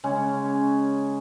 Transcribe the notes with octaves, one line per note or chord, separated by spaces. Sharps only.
C#3 G#3 C#4